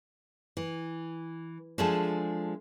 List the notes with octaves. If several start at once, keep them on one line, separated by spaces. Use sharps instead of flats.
E3
F3 G#3 A3 D4 G#4 A4